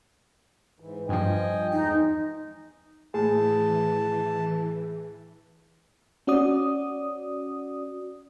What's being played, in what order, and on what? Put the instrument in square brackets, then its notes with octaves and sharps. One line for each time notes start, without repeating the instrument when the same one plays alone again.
[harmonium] G#2 E3
[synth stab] G2 F3 [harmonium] D#5 G5 G#5
[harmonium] E2 G#3 [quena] D#4
[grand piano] A2 [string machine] E3 [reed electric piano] G#4 [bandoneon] A5
[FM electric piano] C#4 F#4 D5 D#6